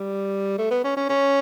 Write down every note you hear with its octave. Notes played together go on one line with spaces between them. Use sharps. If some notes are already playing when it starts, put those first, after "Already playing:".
Already playing: G3
A3
B3
C#4
C#4
C#4